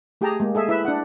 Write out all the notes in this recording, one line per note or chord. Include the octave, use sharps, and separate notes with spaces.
A3 G4 G#4 G5 A5 A#5
G#3 A#3
G#4 A4 E5
E4 B4 E5
D4 F#5